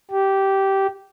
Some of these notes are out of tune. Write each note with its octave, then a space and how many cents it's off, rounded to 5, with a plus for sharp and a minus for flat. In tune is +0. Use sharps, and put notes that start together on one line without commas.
G4 -15